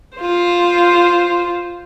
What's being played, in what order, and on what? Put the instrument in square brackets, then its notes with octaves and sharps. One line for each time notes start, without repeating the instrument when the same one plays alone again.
[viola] F4 C5